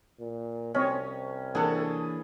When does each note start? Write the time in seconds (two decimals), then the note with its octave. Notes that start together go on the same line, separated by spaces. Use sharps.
0.20 A#2
0.74 C2 C4 C#4 C#5 D#5
1.55 E3 A#3 D4 G#4 A4 F#5